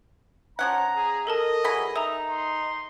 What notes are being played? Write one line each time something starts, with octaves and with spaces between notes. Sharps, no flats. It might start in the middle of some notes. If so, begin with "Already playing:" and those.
F3 C#4 F#5 A#5
G#4
A4 A#4 D#5 A5
E3 F#3 G#4 B5
D#4 E5 A#5 D#6
C6